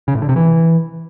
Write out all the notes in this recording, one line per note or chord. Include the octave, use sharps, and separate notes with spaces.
C#3
A2
D3
C3
E3